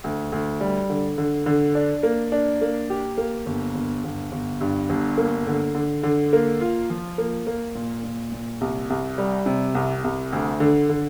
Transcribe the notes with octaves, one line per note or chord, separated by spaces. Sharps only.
D2
D2
G3
D3
D3
D3
D4
A#3
D4
A#3
G4
A#3
G1
G1
G1
G1
G2
G1
A#3
D3
D3
D3
A#3
F4
F3
A#3
A#3
A#2
A#2
A#2
C2
C2
G3
C3
C2
C2
D2
D3
D3